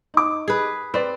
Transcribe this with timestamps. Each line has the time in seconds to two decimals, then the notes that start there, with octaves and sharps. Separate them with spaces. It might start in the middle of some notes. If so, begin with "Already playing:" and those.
0.14 D#4 D6
0.48 G#4 B4
0.94 C4 B4 D5